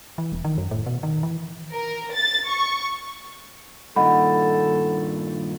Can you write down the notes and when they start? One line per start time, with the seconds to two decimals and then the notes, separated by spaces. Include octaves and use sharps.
0.18 E3
0.32 E1
0.44 D#3
0.58 F#2
0.71 A2
0.86 B2
1.03 D#3
1.23 E3
1.73 A#4
2.14 A6
2.49 C#6
3.96 G2 A#2 D#3 A4 D#5 F#5 B5